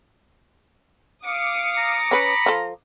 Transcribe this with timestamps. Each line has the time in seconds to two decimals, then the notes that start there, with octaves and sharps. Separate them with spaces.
1.25 F5 D6 D#6 C#7
1.78 A#5
2.11 C#4 B4 B5
2.46 F3 F4 A4